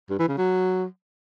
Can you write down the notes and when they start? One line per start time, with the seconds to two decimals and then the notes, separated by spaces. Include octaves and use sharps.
0.10 G2
0.19 E3
0.29 C#3
0.38 F#3